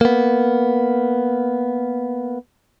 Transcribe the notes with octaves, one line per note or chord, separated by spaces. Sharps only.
A#3 B3